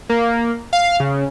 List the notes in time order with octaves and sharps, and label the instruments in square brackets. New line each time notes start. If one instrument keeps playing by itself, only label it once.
[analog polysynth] A#3
F5
C#3